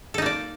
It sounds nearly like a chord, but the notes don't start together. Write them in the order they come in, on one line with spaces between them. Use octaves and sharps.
A4 D#4 A#3 D5